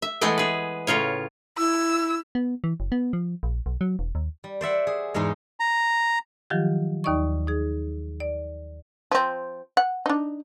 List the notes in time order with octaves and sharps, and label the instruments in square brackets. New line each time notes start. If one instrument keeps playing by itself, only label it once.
[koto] E5
E3 G#3 A3 B3 G5
G#4 B4
A2 C#3 F4 C#5
[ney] E4 [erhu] E6
[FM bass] B3
E3
F#1
B3
F3
A#1
B1
F#3
E1
D#2
[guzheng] G3
C5 D5 E5 F#5
G#4
E2 G#2 G#3 D#4 G#4
[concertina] A#5
[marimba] D#3 F3 F#3 F4 G4
D#2 D#4 D5 D#5 C#6
D#4 G#4
D5
[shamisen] F3 C4
F#5
D4 D#4